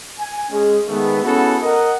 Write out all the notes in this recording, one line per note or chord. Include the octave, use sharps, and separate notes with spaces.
G#5
G#3 C#4 G#4
D#3 G#3 A3 B3
B3 C#4 E4 F#4 G#4 A4
A#4 D#5 F#5